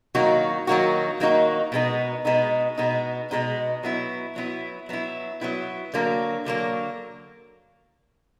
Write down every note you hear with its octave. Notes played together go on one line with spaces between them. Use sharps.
D#3 F#3 A#3 D#4 F#4
D#3 F#3 A#3 D#4 F#4
D#3 F#3 A#3 D#4 F#4
B2 G#3 B3 D#4
B2 G#3 B3 D#4
B2 G#3 B3 D#4
B2 G#3 B3 D#4
F#3 B3 E4
F#3 B3 E4
F#3 B3 E4
F#3 B3 E4
D3 F#3 A#3
D3 F#3 A#3